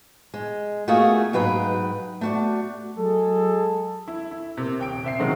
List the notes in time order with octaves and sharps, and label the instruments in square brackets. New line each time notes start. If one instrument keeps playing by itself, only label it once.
[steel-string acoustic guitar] G#3
A3 A#3 F4 F#4 G#4
G#2 F#3 B4 G5 A#5
A3 F#4 D5
[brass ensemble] F#3 G#3 G#4 A4
[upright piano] E4
E4
C3 A#3
D#1 G5 D7
C3 E5 C7
C3 D#3 F#3 G#3 C4